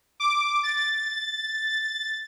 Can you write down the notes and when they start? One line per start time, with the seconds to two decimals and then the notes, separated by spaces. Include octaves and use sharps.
0.20 D6
0.63 A6